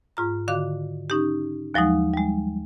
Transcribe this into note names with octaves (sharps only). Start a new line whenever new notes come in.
G#2 F4 A#5
D3 D#3 F#4 F5 D6
C#4 D#4 G4
D#2 F3 F#3 G#3 D#4
G3 G#3